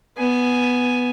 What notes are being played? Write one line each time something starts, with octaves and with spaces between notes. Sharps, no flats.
B3 G#5